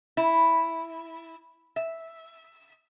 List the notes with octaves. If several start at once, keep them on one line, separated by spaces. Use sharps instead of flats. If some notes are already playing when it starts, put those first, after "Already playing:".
E4
E5